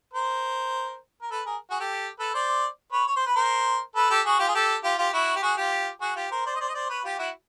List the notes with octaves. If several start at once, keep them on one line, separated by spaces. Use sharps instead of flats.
A#4 C5
A#4
A4 B4
G#4 A#4
F#4 G#4
G4 A4
A4 B4
C5 D5
B4 C#5
C#5
C5
B4
A#4 C5
A4 B4
G4 A4
F#4 G#4
F4 G4
G#4
G4 A4
F4 G4
F4 G4
E4 F#4
G4
F#4 G#4
F4 G4
F#4 G#4
F4 G4
A#4 C5
C5 D5
D#5
C5 D5
D#5
C5 D5
B4 C#5
F4 G4
E4 F#4